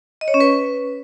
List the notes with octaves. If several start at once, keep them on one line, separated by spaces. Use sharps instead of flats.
D#5
C#5
C#4
B4